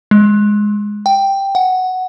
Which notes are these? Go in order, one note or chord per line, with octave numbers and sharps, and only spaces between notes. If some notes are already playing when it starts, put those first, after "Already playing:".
G#3
G5
F#5